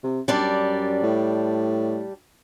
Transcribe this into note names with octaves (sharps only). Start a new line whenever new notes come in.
C3
F#2 G3 D4 D5
A2